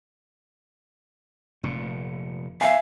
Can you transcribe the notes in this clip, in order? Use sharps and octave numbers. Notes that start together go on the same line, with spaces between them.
F1 A#2
E5 F5 G#5